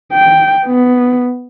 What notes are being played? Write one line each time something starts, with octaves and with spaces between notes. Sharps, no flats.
G5
B3